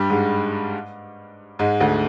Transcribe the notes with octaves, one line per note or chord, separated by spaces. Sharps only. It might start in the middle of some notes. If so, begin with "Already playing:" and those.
Already playing: G2 G3
G#2 G#3
G#2 G#3
D2 D3